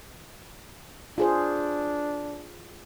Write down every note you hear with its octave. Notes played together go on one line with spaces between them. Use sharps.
D4 F4 G#4 C5